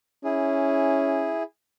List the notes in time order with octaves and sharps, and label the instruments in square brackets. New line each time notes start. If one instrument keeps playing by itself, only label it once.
[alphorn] C#4 [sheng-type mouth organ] E4 G#4